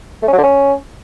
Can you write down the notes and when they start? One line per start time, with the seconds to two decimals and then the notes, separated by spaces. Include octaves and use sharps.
0.23 A3
0.28 C#4
0.33 F#3
0.38 D3
0.43 C#4